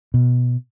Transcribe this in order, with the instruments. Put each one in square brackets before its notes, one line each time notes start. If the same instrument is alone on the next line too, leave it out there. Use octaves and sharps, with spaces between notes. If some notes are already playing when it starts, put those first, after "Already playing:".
[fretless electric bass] B2